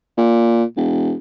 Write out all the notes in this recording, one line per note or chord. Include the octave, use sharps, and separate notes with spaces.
A#2
E1